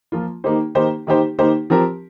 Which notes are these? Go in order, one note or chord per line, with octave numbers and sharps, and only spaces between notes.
F3 A#3 F4
D#3 A#3 D#4 G4 C5
D#3 A#3 D#4 G4 C5
D#3 A#3 D#4 G4 C5
D#3 A#3 D#4 G4 C5
F3 C4 G4 A#4